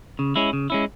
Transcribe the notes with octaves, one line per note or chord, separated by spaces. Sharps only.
C#3
G#3 C#4 E4
C#3
G#3 C#4 E4